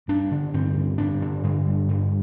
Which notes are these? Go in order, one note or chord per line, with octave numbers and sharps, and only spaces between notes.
G2 D4
D3
G2 C4
D3
G2 D4
D3
G2
D3
G2